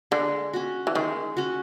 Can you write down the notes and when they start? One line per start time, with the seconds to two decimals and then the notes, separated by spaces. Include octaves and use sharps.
0.11 D3 G#3
0.53 C#4 F#4
0.87 E3
0.95 D#3 G#3
1.37 C#4 F#4